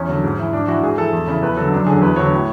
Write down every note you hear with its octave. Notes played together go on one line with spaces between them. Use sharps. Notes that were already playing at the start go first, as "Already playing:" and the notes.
Already playing: E2 C#4
D3 F#3
G#2
E3
G#2 D4
E3 F#4
G#2 G#4
E3 A4
E2
C#3 E3
E2 B4
D3 F#3 A4
F#2 D4
D3 F#3 G#4
E2 B4
D3 F#3 C#5
A2